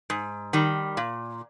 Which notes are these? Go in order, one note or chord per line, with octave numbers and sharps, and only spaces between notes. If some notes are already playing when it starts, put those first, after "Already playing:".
G#2
D#3 G3
A#2